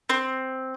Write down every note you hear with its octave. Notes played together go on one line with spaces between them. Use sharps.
C4